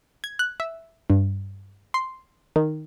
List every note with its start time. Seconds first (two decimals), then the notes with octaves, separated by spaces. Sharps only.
0.24 G#6
0.39 F#6
0.60 E5
1.10 G2
1.94 C6
2.56 D#3